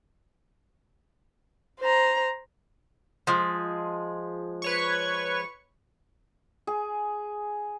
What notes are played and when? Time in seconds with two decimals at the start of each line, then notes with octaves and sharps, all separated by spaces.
1.80 C5 A#5
3.27 F3 G#3
4.62 B4 C#5 C#6
6.67 G#4